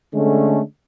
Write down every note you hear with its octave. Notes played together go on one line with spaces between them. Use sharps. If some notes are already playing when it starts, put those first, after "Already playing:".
D3 G#3 A3 C#4